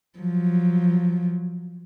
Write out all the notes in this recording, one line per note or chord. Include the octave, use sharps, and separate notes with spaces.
F3 F#3